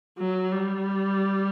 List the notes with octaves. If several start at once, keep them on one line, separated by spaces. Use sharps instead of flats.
F#3
G3